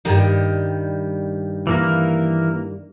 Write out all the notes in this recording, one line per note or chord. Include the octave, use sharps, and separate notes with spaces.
G2 D#3 G3
E3 A#3 A#4